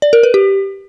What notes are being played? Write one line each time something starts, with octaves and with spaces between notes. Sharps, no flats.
D5
A#4
B4
G4